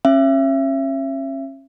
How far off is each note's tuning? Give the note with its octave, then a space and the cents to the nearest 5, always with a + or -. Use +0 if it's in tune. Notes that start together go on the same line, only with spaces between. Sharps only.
C#4 -35 E5 +30